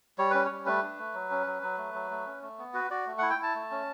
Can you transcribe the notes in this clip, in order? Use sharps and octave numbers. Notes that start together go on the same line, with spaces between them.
G3 C#5
C#4 B4
C#5
G3
A3 B4
D4
A3
F#3
C#4
F#3
F#3
A3
F#3
A3
C#4
A3
B3
F#4 B4
F#4 D5
A3
E4 F#5
G5
E4 A5
A3
C#4